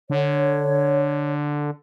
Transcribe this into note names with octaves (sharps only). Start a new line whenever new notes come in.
D3 C#5